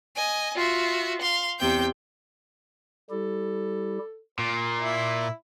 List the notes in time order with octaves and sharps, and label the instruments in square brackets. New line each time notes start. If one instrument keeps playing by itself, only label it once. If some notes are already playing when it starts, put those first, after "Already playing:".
[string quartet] D#5 G#5
F4 F#4 E5
F5 C6
E2 C3 G5 G6
[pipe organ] G3 E4 G4 [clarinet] A4
[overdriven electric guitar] A#2 [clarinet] C6 [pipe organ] D6
[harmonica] E4